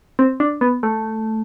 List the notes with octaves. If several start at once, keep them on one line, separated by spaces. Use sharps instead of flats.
C4
D4
B3
A3